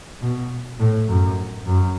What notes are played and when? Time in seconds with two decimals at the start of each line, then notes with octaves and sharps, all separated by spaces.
0.21 B2
0.79 A2
1.08 F#2
1.66 F#2